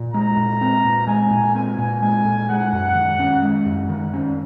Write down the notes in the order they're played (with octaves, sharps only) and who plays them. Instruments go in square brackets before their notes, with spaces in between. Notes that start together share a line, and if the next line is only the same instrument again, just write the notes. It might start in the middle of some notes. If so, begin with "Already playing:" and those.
Already playing: [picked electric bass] A#2
[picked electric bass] G#3 [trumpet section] A#5
[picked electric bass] A#2
C4
A#2
[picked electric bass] G#3 [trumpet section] G#5
[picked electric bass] A#2
[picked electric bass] C4 [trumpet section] G#5
[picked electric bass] A#2
[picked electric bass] G#3 [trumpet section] G#5
[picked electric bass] A#2
[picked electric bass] G#3 [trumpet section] F#5
[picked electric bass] F#2
D#3
C#4
G#3
F#2
D#3
C#4